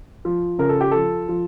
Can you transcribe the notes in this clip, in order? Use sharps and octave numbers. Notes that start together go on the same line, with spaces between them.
F3
C#3 A#4
A4
G4
F3 A4
F3